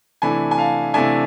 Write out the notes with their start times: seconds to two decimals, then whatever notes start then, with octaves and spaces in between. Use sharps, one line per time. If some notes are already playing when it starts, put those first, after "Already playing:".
0.22 C3 E3 A3 D4 G#5 B5
0.51 G#5
0.58 F5 A5
0.94 C3 E3 A3 D4 E5 G#5